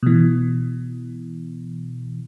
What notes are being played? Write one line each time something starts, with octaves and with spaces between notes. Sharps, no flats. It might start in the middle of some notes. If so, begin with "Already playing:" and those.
B2 E3